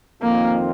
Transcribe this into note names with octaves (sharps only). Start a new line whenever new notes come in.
F2 D#3 A#3 C4 F4